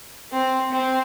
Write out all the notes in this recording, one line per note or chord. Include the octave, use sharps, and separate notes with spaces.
C4
C4